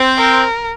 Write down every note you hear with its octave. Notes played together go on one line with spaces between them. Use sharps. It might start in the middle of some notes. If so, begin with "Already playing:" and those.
Already playing: C4
A#4